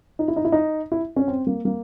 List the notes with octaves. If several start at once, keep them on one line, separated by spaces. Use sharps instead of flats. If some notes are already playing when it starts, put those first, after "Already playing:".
D#4
E4
D#4
E4
D#4
E4
C#4
C4
A#3
A#3